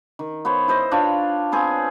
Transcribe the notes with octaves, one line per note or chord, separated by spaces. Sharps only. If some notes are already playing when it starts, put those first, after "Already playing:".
D#3
B3 C5 C#5
E4 C5 D#5
D4 F4 C#5
B3 C4 G#4 G#5